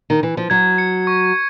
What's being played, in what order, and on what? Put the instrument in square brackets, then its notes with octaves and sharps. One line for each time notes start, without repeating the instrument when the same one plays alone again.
[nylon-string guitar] D#3
E3
F3
[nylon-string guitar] F#3 [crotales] G#6
[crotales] C#7
C#6